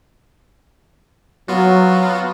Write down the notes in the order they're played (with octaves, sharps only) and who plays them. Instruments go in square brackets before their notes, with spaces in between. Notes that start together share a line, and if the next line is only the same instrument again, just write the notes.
[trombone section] F#3 [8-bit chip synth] B3 F4 F#4